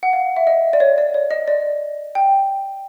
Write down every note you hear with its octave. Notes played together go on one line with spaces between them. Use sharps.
F#5
F5
E5
D#5
D5
C#5
D5
C#5
D#5
D5
G5